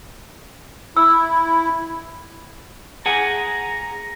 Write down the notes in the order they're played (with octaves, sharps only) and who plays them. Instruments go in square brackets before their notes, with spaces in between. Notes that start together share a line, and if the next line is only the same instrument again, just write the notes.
[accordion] E4 [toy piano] E6
[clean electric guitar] G#4 F#5 G#5 [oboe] A#5